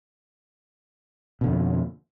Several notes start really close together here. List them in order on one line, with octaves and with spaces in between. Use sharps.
B2 D3 F2